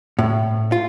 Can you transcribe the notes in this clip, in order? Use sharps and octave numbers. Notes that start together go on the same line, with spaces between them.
A2
F4